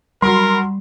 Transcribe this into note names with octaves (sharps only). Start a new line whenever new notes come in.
F#3 G3 A#4 B5 C6